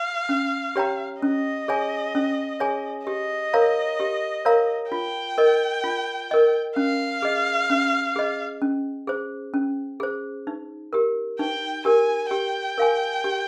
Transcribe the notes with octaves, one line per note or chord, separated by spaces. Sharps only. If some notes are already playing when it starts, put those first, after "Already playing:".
Already playing: F5
C#4
G4 C#5 G5 A#5
C#4 D#5
G#4 C#5 G#5
C#4
G#4 C#5 G#5
G4 D#5
A#4 C#5 F5 A#5
G4
A#4 C#5 F5 A#5
F4 G5
A#4 D#5
F4
A#4 D#5
C#4 F5
G#4 D#5
C#4
G#4 D#5
C#4
G#4 C5
C#4
G#4 C5
D#4
G4 A#4
D#4 G5
G4 A#4 G#5
G4 G5
A#4 F5 G#5
G4